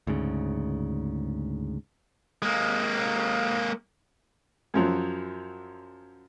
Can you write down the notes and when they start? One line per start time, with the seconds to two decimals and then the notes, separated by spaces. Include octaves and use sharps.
0.07 D2 G#2 C#3
2.42 G#3 A#3
4.74 F#2 F3 F#3